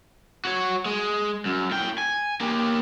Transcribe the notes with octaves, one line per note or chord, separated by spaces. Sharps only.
F#4 C#5
G#3
F#2
A2 G5
G#5
A#3 G4